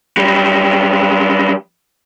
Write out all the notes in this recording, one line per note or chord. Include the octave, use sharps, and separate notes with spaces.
F#2 G3